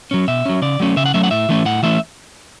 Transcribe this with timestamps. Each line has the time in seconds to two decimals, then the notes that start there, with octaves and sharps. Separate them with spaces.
0.11 F#3 C#4
0.28 B2 E5
0.45 F#3 C#4
0.62 C#3 D5
0.80 F#3 A3 C#4
0.97 C#3 E5
1.06 F#5
1.14 F#3 A3 C#4 E5
1.23 F#5
1.31 A2 E5
1.49 E3 A3 C#4
1.65 A2 F#5
1.83 E3 A3 C#4 E5